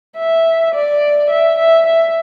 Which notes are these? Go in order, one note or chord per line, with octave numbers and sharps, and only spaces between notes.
E5
D5
E5
E5
E5